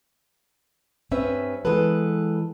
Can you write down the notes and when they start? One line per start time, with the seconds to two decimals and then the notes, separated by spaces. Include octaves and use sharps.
1.11 G2 C4 C#4 B4 E5
1.65 E3 G#3 B3 A4 B4